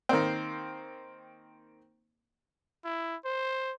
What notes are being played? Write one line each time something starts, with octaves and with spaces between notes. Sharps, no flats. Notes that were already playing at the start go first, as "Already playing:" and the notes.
D#3 A#3 C4
E4
C5